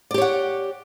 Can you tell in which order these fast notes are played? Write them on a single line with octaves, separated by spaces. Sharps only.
D5 G4 C#5 F#5